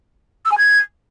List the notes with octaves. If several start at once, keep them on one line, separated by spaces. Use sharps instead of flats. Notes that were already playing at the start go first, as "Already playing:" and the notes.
E6
G#5
G#6